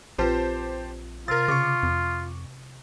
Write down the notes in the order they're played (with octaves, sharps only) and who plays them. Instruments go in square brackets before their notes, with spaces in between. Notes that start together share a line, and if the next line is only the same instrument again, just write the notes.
[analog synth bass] A#1 [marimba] C4 F4 B4 [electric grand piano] G4 C5 A5
[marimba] C3 [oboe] F4 [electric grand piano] A#4 A6
[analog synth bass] C#3 [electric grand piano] C#6 D6
[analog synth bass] F2